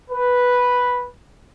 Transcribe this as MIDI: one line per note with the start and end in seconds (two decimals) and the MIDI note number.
0.11 1.03 71